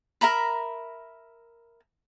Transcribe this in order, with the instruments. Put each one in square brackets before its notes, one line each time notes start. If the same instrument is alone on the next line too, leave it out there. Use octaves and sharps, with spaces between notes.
[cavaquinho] A#4 E5 A#5 B5